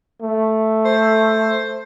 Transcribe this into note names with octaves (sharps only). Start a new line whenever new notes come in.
A3
C5